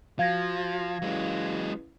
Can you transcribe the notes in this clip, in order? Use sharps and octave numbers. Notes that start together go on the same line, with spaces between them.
F3 F#4 F5 G#6 A#6
F#3 G#3 C#4 E4 B4